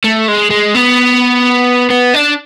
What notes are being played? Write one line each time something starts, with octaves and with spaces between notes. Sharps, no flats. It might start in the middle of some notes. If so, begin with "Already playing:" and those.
A3
G#3
G#3
B3
B3
D4